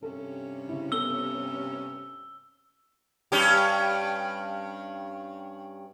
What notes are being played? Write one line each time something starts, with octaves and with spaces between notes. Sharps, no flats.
G2 C3 C#4 A4
C#3 E4
B3 A4 E6 G7
G2 C#4 G4